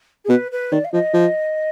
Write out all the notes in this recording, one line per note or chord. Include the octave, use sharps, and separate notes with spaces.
G#4
B2 B4
B4
D#3 D5
F5
F3 D#5
F3